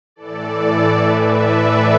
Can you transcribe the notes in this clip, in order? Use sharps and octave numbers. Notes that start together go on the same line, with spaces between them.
A2 E3 A4 D5
A2 E3 B4 E5
A4 D5